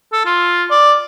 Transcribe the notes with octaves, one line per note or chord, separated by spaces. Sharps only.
A4
F4
D5